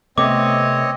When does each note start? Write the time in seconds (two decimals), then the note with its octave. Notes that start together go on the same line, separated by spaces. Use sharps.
0.18 C3 A3 B3 C4 C#5 D#5 D6